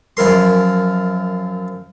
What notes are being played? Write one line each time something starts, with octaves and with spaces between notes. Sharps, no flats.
F#2 F3 E4 A#4 C6